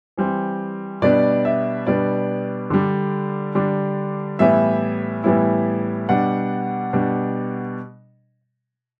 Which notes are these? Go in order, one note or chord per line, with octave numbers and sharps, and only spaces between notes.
E3 G3 C4
B2 G3 B3 D4 D5
E5
B2 G3 B3 D4 D5
D3 G3 D4
D3 G3 D4
A2 E3 G3 B3 E4 E5
A2 E3 G3 B3 E4
B2 G3 D4 F#5
B2 G3 D4